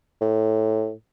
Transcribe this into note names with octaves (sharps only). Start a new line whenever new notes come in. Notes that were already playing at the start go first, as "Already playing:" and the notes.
A2